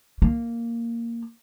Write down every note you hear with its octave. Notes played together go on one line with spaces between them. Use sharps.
A#3